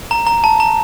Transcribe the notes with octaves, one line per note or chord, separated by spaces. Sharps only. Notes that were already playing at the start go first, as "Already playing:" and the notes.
A#5
A#5
A5
A#5